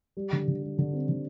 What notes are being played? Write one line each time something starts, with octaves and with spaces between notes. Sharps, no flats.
G3
D3
D3
G3
D3
C4
D3